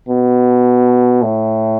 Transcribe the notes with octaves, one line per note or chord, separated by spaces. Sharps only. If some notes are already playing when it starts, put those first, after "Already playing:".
B2
A2